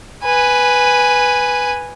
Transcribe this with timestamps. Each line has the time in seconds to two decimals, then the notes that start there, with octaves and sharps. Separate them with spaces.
0.24 B4 G#5